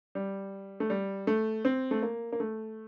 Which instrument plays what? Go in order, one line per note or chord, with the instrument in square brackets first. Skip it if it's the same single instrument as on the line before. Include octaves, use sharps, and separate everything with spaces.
[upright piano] G3
A3
G3
A3
C4
A3
A#3
A#3
A3